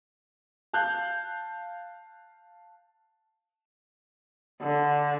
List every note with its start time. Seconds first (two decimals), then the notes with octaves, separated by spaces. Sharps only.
0.73 F5 A5 F#6 G6
4.61 D3